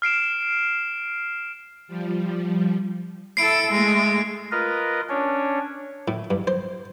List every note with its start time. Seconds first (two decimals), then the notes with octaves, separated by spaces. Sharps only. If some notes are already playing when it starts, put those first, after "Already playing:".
0.02 F6 C7 D7 E7
1.88 F3 G3
3.37 E4 A4 C7 D7
3.70 G#3 A3
4.52 F4 A#4 B4 D#5
5.09 C#4 D4 C#5
6.08 A2
6.31 G2
6.47 C5